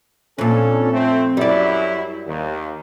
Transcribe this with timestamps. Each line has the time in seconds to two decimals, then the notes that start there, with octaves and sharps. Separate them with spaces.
0.39 F2 A#2 C#4 D4 A4
0.93 A3 C4
1.37 F#2 G3 E4 D5
2.27 D#2